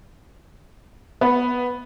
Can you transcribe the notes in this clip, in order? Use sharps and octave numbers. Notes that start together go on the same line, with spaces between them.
B3